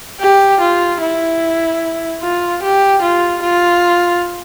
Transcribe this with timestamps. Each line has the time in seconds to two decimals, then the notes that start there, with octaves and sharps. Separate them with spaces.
0.21 G4
0.61 F4
1.01 E4
2.22 F4
2.63 G4
3.02 F4
3.42 F4